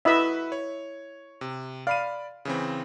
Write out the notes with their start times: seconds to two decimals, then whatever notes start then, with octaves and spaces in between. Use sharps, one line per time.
0.05 E4 F#4 B4 D#5 E5 B5
0.52 C#5
1.41 C3
1.87 D5 F5 B5 D#7
2.45 C#3 E3 C4